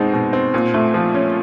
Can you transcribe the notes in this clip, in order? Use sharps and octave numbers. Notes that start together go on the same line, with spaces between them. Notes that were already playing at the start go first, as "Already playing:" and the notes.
Already playing: B2 G#3 C4 D#4
B2
C4
A#2
A3
F3
C#4